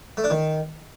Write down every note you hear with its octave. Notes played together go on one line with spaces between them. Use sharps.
A3
D4
D#3